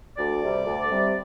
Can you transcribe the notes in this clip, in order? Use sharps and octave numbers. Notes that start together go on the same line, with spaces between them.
D2 D5
C3 G3
D2
C3 G3